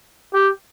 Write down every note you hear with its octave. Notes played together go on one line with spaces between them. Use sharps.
G4